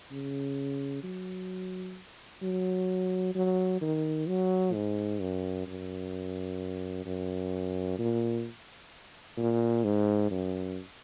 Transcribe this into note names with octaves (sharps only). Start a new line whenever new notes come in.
C#3
F#3
F#3
F#3
D#3
F#3
G#2
F#2
F#2
F#2
A#2
A#2
G#2
F#2